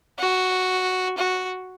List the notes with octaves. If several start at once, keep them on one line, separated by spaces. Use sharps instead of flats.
F#4
F#4